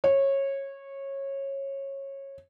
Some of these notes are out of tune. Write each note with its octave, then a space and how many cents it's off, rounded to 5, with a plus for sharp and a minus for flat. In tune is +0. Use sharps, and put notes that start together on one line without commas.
C#5 -20